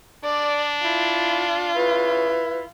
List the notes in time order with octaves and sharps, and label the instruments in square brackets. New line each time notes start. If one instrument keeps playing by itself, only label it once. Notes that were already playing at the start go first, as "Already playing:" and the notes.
[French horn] D4 [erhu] D5
[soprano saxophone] E4 [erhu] F4
[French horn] C#3 [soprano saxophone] E4 [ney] B4